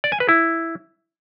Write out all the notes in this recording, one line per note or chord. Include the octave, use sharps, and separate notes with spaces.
D5
G#5
B4
E4